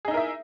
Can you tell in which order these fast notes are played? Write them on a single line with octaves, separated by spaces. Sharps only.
G#4 D#4 E4 A#4 E5